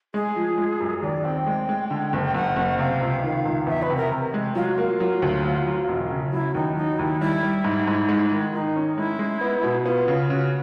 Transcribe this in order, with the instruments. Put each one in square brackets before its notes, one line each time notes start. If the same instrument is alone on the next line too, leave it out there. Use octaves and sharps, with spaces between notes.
[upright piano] G#3 [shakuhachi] G#4
[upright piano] F3
G#3
F#2
[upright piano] D#2 [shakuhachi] D5
[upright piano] C4 [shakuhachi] G5
[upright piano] G#3
G#3
D3
F#1
[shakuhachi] G5
[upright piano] F#1 [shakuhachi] F#5
[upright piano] F#1
[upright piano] C3 [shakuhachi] F5
[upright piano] C#2
D#3
C#2
[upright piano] E2 [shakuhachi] E5
[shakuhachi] B4
[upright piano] C3
[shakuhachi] A#4
[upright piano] C3
G#3
[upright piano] F#3 [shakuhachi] F4
[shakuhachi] F#4
[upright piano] A#3 [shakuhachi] F4
[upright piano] F#3
D2
F#3
F#3
E1
C#3
[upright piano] F#3 [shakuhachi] E4
[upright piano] D#2 [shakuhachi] D#4
[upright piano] F#3 [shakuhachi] D#4
[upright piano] D#2 [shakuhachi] E4
[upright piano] G3 [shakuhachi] E4
[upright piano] G3
G#2
G#2
G#3
D#3
[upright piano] D#3 [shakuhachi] D#4
[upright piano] C#4
[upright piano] G#3 [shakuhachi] E4
[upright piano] G#3
B3
B2
[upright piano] B3 [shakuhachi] F4
[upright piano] C#3
[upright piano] C#3 [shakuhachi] F#4